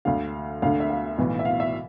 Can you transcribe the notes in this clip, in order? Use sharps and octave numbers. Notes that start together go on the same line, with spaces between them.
D2 D3 F5
D2 D3 F5
E5
F5
B1 A2 E3
E5
F5
E5